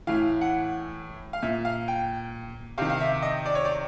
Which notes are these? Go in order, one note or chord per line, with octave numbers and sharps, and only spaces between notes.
A2 E3 F5
F#5
F5
A#2 E5
F5
G5
C3 D#3 F5
F5
E5
D#5
D5
C#5
D5